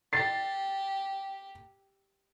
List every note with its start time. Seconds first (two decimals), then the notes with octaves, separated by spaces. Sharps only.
0.13 G4 A6 C7